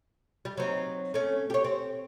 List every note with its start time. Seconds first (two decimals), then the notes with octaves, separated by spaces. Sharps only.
0.45 G3
0.57 F#3 C4 D#4
1.14 A3 C#4
1.50 G4 C#5
1.64 C4